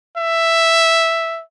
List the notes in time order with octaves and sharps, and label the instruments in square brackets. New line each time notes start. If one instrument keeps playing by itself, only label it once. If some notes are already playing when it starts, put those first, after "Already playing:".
[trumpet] E5